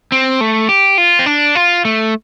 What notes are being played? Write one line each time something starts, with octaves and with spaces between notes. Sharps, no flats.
C4
A3
G4
F4
C4
D4
F4
A3